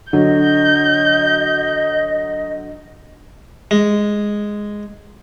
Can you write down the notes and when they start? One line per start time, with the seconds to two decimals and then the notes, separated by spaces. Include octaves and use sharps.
0.13 D3 F#3 D#5 G6
3.71 G#3